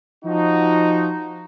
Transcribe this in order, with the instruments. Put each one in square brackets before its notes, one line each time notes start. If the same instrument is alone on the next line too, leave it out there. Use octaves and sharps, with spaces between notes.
[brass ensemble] F3 D#4 F#4